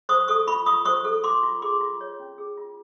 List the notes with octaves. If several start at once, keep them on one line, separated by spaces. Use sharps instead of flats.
C5 C#6 D#6
A4 C#6 D#6
F4 B5 C#6
F4 C#6 D#6
C5 C#6 D#6
A4
F4 C6 D6
F4
G#4 C6 D6
F4
C#5
C#4
G#4
F4